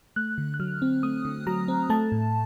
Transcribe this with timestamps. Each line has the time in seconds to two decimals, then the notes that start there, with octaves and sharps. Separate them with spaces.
0.16 A3 F#6
0.38 D3
0.54 F#6
0.60 F#3 F6
0.82 C4
1.03 A3 D#6
1.25 D3
1.47 F#3 A#5
1.68 C4
1.90 A3 A5
2.12 A2